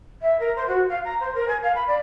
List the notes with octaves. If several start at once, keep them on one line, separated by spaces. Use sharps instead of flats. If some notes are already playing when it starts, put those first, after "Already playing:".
E5
A#4
C5
F#4
F5
A#5
C5
A#4
G#5
F5
B5
D5